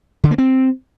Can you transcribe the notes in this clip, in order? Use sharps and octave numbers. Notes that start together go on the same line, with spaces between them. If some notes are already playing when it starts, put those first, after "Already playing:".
D3
A#3
C4